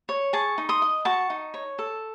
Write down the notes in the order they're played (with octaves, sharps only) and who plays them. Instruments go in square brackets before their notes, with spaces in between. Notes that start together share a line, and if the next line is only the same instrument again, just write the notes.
[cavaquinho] C#5
G#4 A5 C#6
D#4
C6 D#6
D#5
F#4 A5 C#6
D#4
C#5
A4